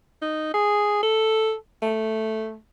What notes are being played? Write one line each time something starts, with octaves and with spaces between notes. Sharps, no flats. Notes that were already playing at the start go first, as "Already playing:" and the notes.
D#4
G#4
A4
A3